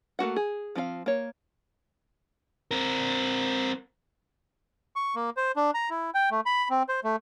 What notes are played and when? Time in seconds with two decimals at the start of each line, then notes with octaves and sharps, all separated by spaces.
0.19 A3 A#3 F#4 F#5
0.36 G#4
0.75 F3 C4 A4 F5
1.06 A#3 C#5
2.71 C4 A#4
4.96 C#6
5.15 A#3
5.37 C5
5.56 D4
5.74 A#5
5.90 E4
6.14 G5
6.31 A3
6.46 B5
6.70 C4
6.89 C5
7.04 A3